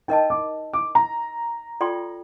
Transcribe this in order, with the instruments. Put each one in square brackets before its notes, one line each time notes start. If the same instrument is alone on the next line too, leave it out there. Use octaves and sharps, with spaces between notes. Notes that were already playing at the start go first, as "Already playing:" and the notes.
[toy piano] D#4 A#4 D#5 A5 [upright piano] G5
[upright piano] D6
D6
A#5
[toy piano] F4 A4 D5 G5 C6